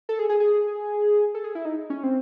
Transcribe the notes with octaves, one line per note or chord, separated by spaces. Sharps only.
A4
G#4
G#4
G#4
A4
G#4
E4
D#4
C#4
C4